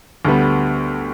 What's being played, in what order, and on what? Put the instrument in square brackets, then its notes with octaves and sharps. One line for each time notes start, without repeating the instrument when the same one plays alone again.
[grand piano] D2 D3 G3 B3